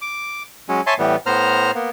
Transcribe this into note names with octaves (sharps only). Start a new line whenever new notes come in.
D6
F#3 G#3 C#4
C#5 E5 G#5 A5 C6
A2 E3 G3 B3
A2 B3 C5 A#5 F6
A#3 B3